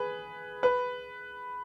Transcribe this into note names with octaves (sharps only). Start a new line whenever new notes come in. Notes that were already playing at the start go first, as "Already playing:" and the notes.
Already playing: G#4 B4
B4